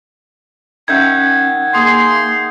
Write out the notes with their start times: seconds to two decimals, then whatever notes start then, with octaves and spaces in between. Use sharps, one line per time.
0.88 D#3 C#4 E5 F#5 G6 G#6
1.74 A#3 G#4 C6 D#6 C7